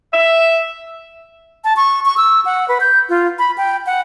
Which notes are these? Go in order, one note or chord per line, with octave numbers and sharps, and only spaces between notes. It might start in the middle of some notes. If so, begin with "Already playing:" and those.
E5
A5
C#6
C#6
E6
F#5
B4
G6
F4
B5
G5
F#5